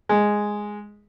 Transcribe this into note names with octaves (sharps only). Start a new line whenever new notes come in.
G#3